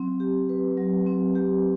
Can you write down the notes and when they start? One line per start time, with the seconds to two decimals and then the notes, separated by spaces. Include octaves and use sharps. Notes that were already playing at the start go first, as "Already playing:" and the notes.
Already playing: F#3 C4
0.20 G4
0.49 B4
0.78 F#3
1.07 C4
1.35 G4